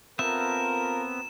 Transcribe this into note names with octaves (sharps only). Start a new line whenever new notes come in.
B3 C4 F4 A4 A#4 E5 E7